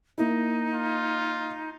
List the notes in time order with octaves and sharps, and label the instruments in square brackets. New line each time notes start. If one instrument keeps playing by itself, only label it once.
[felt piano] A#3 E4 [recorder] D#4
[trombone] F4